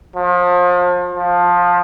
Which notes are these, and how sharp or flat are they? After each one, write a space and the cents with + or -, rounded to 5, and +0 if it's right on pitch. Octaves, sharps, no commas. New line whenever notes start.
F3 +30
F3 +15